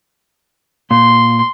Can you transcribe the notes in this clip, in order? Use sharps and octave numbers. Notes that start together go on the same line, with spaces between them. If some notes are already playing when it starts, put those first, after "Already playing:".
A#2 C6